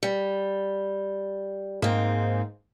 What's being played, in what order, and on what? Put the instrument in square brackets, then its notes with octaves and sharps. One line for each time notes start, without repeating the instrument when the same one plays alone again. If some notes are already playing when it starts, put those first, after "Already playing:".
[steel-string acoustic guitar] G3
[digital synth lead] G#2 [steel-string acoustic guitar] A#3 C4